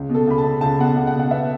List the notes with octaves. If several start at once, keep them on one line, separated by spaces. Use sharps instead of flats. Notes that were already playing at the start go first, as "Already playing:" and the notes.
Already playing: C#2
B2
A4
C#2 B5
A5
C#2
C#2 A5
B2 F#5 A5
C#2
F#5
B2
F#5
B3 E5